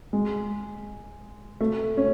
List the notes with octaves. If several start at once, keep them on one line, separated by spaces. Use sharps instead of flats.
G#3
A3
C#4